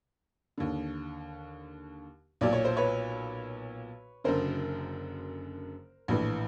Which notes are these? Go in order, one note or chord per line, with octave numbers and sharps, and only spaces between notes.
D#2 D3
B1 A#2 D5
C#5
C5
B4 C#5
F#1 F#2 D3 A#4 C5
A#1 A2 E3